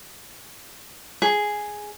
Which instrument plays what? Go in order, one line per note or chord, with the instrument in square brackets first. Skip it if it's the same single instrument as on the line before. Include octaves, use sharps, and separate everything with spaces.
[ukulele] G#4